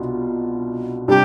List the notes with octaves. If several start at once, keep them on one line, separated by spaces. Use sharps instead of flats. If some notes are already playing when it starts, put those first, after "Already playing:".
Already playing: C2 B2 D4 F4
C3 G3 D4 G4